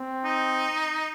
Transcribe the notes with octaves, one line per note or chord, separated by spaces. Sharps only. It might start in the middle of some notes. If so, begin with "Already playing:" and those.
Already playing: C4
D#4